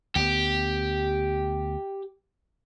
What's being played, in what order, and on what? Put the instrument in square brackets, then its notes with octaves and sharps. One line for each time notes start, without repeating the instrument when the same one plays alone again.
[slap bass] D2 B3 [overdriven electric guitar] G4